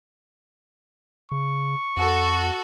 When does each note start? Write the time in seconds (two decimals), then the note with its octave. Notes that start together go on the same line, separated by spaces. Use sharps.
1.32 C#3 C#6
1.97 F2 F#4 A4